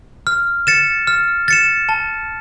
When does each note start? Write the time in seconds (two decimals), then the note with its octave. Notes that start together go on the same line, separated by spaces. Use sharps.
0.27 F6
0.67 A6 C#7 E7
1.07 F6
1.48 A6 C#7 E7
1.89 A5